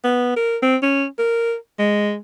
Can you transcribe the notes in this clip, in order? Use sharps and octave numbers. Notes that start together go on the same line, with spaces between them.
B3
A#4
C4
C#4
A#4
G#3